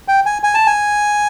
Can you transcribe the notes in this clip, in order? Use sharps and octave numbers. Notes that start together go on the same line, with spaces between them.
G5
G#5
G#5
A5
G#5